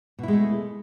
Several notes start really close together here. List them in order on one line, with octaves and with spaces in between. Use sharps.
B2 E4 G#3 A3